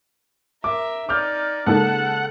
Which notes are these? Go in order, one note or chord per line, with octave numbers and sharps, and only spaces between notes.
A#4 E5 D6
D#4 D5 D6 F6 G6
C#3 G#3 A#3 B3 D#4 A4 F#5 A5